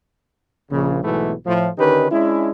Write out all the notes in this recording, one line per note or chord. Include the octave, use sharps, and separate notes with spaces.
A#1 C#3
B1 G#2 B2 E3 A3 B3
A2 F3
D3 D#3 C#4 D#4 G4 B4
G#3 C#4 D4 E4